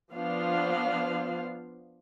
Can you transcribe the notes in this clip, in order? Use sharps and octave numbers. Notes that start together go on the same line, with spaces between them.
F3 B3 D4 F4 C5 F5